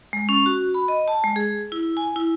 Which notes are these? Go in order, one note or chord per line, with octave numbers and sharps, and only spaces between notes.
G#3
C#4
F#4
B5
D#5
A5
G#3
G#4
E4
G#5
E4